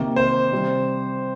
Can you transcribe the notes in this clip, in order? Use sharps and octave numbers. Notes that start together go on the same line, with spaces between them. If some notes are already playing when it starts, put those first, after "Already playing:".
Already playing: C3 D#3 A#3
C5
C3 G3 C4